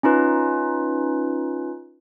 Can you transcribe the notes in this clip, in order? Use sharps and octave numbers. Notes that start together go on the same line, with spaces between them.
C#4 D#4 F4 B4